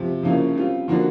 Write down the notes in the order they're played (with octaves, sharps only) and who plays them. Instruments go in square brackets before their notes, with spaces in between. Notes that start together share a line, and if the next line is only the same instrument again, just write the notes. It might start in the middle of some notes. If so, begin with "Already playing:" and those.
Already playing: [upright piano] C3 F3
C#3 F3 A#3 C#4 E4
G3 C4 F4
D3 F3 A#3 D4 F#4